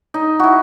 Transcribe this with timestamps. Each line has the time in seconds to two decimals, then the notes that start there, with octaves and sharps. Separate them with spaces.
0.14 D#4
0.39 E4 F#4